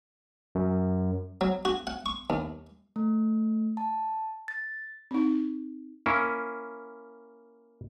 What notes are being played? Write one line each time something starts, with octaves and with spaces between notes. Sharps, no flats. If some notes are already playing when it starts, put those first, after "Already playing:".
F#2
F#3
F#4
F#5
C#6
D#2
A3
A5
A6
C4 D#4
A#3 C#4 E4